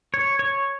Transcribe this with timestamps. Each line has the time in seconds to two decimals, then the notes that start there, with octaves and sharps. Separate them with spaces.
0.14 C#5
0.39 C#5